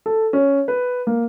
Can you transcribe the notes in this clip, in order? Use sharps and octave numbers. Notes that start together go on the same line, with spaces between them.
A4
C#4
B4
A#3